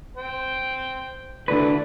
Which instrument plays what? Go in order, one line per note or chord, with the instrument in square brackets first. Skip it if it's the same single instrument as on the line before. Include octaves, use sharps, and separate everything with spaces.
[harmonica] C5 G5
[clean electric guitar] D2 B4 [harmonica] E3 A3 [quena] D5